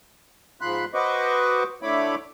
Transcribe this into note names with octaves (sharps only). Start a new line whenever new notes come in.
G#2 F3 B5 C6 F#6
F#4 B4 C5 D#5 C#6 D6
D3 A3 E4 C#5 B5 D6